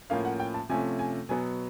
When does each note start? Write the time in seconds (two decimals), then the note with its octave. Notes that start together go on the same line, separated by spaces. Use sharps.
0.10 A2 F3 A#3 C#4 F5
0.25 F#5
0.40 G5
0.54 A5
0.69 C3 F3 A3 C#4 G#5
0.99 G#5
1.29 B2 F#3 B3 G#5